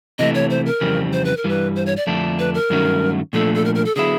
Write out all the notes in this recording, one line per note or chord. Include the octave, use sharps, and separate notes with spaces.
C3 E3 A3 D#5
C#5
C5
A#4
F2 C#3 E3 G3 C4
C5
B4
A#4
G2 E3 G3 B4
C5
C#5
D5
F2 D3 F3 A3 D4
B4
A#4
G2 D#3 F#3 A3 C#4
A#2 F3 A3 D4 A4
A4
A#4
A#4
A4
D3 F#3 B3 E4 G#4